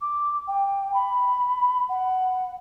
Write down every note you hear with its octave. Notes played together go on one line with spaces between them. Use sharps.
D6
G5
B5
F#5